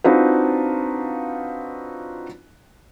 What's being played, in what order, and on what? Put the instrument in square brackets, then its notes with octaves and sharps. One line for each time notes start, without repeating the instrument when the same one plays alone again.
[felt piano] C4 D4 D#4 F4 F#4 B4